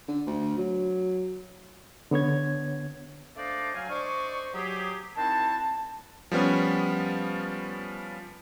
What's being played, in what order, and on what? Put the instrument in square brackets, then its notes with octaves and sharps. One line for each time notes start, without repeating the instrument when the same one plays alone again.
[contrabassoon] D3
D2
F#3
[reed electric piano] D3 B3 C#5 G#6
[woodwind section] A3 D4 C5 D5 D#5 F5
F#3 F5 G#5
D4 C5 D5 D#5 C#6
F#3 G4 G#4
D#3 C4 E4 F#4 C5 A5
[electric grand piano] F3 G3 B3 C#4